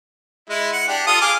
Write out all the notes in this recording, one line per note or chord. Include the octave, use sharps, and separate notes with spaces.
G#3 E4
F#5
D4 G4
F4 A4 D#6
G#4 D6 F6